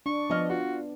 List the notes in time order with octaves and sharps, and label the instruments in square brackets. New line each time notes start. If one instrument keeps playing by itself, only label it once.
[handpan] D4 [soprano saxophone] C#6
[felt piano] F3 D#5 F6 [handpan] B3
[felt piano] F4 [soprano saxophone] F#4